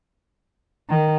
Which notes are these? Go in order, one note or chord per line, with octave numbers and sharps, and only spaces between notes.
D#3